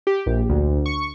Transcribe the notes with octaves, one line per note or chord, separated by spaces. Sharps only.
G4
A#1
D2
C#6